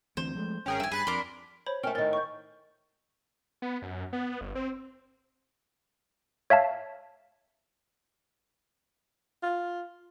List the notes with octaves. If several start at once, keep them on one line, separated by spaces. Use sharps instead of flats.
D2 E3 C4 C5
F3 G#3 A3
G#1 C#4 G#4 A#4 G5
G2 E5 G#5
G2 G#4 G#5 B5 F#6 A6
F2 D4 A#4 C6 D6
C5 C#5 B5
A3 C#4 A#4 G5 F6
A2 D#3 A#4 A6
C#6 G6
B3
F#2
B3
G1
C4
C#5 E5 F5 A5
F4